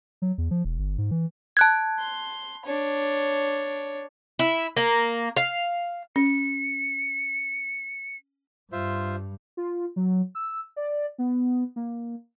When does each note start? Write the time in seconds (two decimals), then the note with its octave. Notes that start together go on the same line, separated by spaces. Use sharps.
0.22 F#3
0.38 E2
0.51 F3
0.65 E1
0.79 G1
0.98 G#2
1.11 E3
1.57 A5 F#6 G#6
1.99 C6
2.65 D4 C#5
4.39 E4
4.77 A#3
5.37 F5
6.16 C#4 C#7
8.72 G2 F4 C5 E5
9.57 F4
9.96 F#3
10.35 E6
10.76 D5
11.18 B3
11.76 A#3